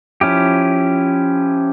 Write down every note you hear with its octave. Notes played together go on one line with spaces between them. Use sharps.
F3 C#4 E4 G4